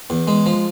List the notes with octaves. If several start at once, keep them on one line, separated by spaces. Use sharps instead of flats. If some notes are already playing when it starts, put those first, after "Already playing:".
E2
G#3
F3